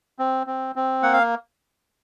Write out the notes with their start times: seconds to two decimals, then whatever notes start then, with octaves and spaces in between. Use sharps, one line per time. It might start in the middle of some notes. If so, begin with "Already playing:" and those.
0.19 C4
0.47 C4
0.76 C4
1.03 A#3 F#5
1.13 F5